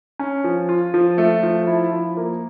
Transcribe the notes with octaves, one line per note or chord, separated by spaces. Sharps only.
C#4
F3
F4
F3
A3
F3
E4
F3
A#3